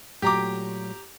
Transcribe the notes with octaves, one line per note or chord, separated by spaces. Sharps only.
A#2 F#3 A3 G4 A#5 D6